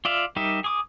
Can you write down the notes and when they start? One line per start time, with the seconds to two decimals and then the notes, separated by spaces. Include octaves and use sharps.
0.05 F4 D5 E5 F5
0.36 G3 D#4 G4 A#4 E5
0.64 G#4 D6 D#6